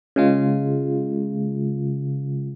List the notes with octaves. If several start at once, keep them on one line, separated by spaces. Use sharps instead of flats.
C#3 G#3 F4